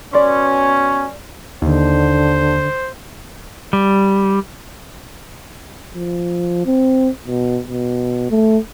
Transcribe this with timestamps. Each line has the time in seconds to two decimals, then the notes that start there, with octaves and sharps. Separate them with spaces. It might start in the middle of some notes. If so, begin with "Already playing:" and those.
0.13 B2 C#4 D5 C6
1.62 D#2 D3 C5
3.73 G3
5.94 F3
6.66 C4
7.27 B2
7.68 B2
8.31 A3